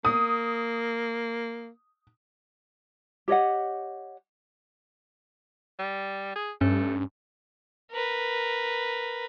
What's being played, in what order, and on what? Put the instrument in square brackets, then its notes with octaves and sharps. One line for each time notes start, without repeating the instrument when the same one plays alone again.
[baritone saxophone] A#3 [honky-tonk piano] D#6
[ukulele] G4 C#5 D#5 F#5
[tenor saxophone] G3
G#4
[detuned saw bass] G2 [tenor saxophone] A3 [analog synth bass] C#4
[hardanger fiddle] A#4 B4